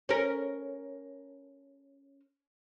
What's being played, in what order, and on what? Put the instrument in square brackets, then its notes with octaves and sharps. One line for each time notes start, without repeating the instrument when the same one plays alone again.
[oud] C#4 A#4